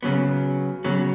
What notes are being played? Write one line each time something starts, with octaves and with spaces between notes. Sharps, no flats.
C#3 F#3 B3
C#3 F#3 B3